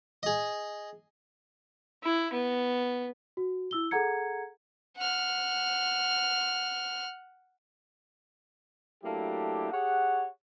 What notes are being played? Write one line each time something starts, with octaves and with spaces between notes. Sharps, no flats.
G#4 D#5
E4
B3
F#4
E4 E6 G7
G#4 A4 F#5 A#5 G#6 C#7
F#5 F6
F#3 A3 A#3 D4 E4 G4
G4 G#4 C#5 F#5